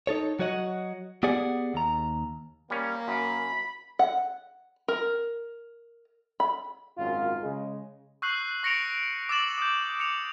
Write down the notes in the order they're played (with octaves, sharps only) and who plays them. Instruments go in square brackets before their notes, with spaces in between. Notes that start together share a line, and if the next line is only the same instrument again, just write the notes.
[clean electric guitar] D#4 A4 C#5
F#3 F#4 C#5 D#5 F#5
B3 G4 G#4 D5 F#5 G#5
D#2 A#5
[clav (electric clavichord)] G3 C#4 [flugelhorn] A#3
[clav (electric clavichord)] F#2 [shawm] B5
[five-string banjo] F#5
A#4
B5
[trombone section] G#1 F#2 F4
C#3 G#3
[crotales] C#6 E6 F#6 G6 C7 F#7
C#6 A#6 C#7 D7 F7
D6 E6 A6 E7 F#7
D#6 G6
C#7 F7